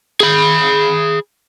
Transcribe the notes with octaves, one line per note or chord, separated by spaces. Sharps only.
G#4 B5